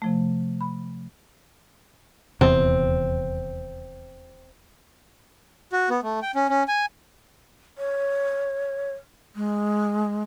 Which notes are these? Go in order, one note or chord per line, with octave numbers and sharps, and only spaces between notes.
C3 F3 A3
B5
D#1 E2 C3 C4
F#4
B3
A3
G5
C#4
C#4
G#5
C#5
G#3